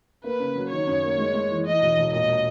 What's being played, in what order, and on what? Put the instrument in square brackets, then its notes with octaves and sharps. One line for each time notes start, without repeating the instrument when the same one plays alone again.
[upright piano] A#3 [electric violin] B4
[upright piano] C#3
F#3
[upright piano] D#3 [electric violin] C#5
[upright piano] F#2
A#3
G#3
G#3
E3
[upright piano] E3 [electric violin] D#5
[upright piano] E1
E1
[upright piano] A#2 [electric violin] D#5